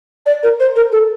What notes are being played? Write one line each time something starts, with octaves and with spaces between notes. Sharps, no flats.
D5
A#4
C5
A#4
A4